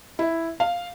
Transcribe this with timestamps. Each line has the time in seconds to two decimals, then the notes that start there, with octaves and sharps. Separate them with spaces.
0.19 E4
0.60 F5